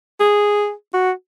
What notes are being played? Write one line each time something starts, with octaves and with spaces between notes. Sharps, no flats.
G#4
F#4